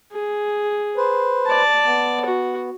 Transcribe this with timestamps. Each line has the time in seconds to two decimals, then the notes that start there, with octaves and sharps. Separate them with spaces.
0.13 G#4
0.97 B4 C5
1.46 D5 A5
1.84 B3
2.25 F#4